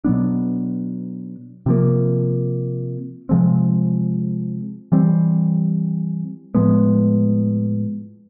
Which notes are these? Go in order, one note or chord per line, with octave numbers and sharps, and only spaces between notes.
B2 F#3 B3 D4
C3 F3 A#3
C3 F3 G#3 C4
E3 G3 C4
A2 F3 G#3 B3